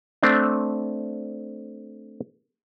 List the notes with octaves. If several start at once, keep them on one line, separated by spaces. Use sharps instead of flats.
A3 C4 D4